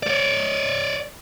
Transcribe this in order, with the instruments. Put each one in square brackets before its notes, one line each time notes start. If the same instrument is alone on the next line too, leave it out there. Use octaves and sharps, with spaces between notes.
[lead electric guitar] C#5 D5